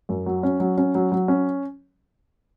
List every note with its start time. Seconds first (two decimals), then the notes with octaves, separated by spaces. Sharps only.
0.09 F#2
0.26 F#3
0.43 C#4
0.60 F#3
0.78 C#4
0.95 F#3
1.12 F#3
1.28 C#4